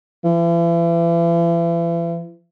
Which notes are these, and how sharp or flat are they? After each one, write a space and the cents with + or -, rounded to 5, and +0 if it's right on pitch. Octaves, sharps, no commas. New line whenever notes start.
E3 +40